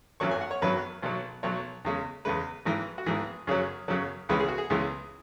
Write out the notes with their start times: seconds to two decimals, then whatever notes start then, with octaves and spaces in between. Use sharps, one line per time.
0.20 G#1 F#2 F#3 C#6
0.31 G#5
0.41 F#5
0.51 C#5
0.62 G#1 F#2 F#3 B4
1.02 B1 B2 F#3
1.43 B1 B2 F#3 C#5
1.85 E2 C#3 G#3
2.25 E2 C#3 G#3 B4
2.65 G#1 G#2 E3
2.98 F#4
3.06 G#1 G#2 E3 G#4
3.47 F#2 C#3 F#3 G#4
3.88 F#2 C#3 F#3
4.29 C#2 C#3 E3 G#3 B4
4.40 G#4
4.48 F#4
4.58 G#4
4.70 C#2 C#3 E3 G#3